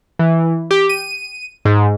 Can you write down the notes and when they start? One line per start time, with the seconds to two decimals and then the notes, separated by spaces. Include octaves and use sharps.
0.19 E3
0.71 G4
0.89 D#7
1.65 G#2